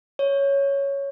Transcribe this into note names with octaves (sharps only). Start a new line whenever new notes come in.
C#5